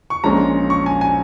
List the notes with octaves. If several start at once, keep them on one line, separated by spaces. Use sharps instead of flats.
C#6
A#1 A#2 G#3 C#4 A#5
C#6
G#5
G#5